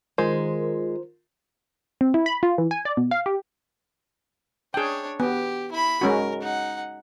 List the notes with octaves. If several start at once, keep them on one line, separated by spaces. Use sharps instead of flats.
D#3 G#3 F4 A#4 C5
C4
E4
B5
F4
E3
G#5
D5
B2
F5
G4
D4 G#4 C#5 G5
B3 G4
E4 B5
G#3 C#4 F#4 A#4
D#4 F#5